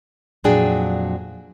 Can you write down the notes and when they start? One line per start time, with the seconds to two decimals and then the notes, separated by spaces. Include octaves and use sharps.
0.44 F2 A#2 F#3 D4 G#4 G5